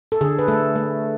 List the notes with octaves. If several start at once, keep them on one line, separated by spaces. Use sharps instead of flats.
A4
D3 G#4
B4
A3 A4
A3